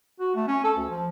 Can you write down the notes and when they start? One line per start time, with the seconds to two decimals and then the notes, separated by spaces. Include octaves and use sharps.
0.19 F#4
0.35 A3
0.48 C#4
0.64 A4
0.77 D2
0.89 F3